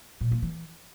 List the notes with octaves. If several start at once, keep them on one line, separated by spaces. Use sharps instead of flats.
A#2
A#3
E3